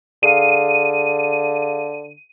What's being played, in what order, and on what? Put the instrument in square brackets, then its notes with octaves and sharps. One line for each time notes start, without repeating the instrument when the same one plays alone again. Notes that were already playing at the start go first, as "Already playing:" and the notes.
[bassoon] D3 [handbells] G#4 F5 [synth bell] D#7